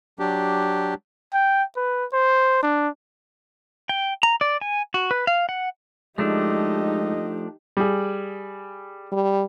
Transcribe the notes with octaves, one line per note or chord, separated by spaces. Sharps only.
F#3 D4 G4
G5
B4
C5
D4
G5
A#5
D5
G#5
F#4
B4
F5
F#5
F3 G#3 A3 D4 D#4 G4 D#5
G3 G#4
G3